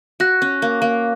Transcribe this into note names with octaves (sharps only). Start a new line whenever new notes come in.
F#4 F#6 A#6
C#4
A#3
A#3